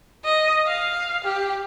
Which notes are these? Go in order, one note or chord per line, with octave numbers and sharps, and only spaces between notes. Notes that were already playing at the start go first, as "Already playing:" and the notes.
D#5
F5
G4